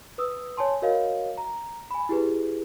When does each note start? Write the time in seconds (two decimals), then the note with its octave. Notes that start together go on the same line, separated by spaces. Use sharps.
0.18 B4 D#6 E6
0.57 C#5 G#5 A5 C6
0.82 F#4 A#4 C#5 D#5 F5
1.38 A#5
1.91 G#5 B5
2.09 E4 G4 G#4 B4